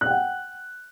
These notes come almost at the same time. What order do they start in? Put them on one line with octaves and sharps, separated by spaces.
F#6 G5 F#5